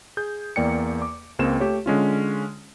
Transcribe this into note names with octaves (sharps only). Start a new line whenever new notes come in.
G#4 G6
E2 A#3 D5 G5 C#7
D6
C#2 G#3 A#3 C4 E7
A3 G4 C#5
D3 G#3 C#4 F4